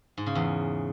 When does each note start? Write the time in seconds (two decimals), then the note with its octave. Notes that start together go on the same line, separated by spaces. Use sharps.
0.18 G#2
0.26 C#3
0.35 E2